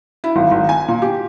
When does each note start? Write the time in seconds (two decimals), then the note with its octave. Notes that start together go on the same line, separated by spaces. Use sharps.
0.24 E4
0.36 G#1
0.51 G#1
0.69 G#5
0.88 A#2
1.02 G4